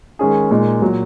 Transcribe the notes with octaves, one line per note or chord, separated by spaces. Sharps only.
D#3 G#3 C#4 G#4
A#2 G#3 D#4
A#2 F#3